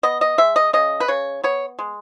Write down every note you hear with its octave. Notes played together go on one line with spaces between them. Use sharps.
B3 D#5
D#5
G#3 E5
D#5
C#3 D#5
B4
C#3 C#5
B3 C#5
G#3